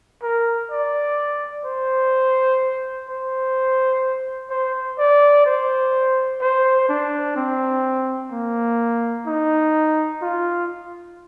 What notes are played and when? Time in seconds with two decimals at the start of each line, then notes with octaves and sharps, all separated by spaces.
0.23 A#4
0.71 D5
1.65 C5
3.09 C5
4.50 C5
4.98 D5
5.46 C5
6.41 C5
6.89 D4
7.36 C4
8.32 A#3
9.26 D#4
10.22 F4